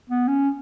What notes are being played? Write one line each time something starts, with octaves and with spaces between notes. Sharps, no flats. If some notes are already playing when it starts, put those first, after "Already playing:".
B3
C#4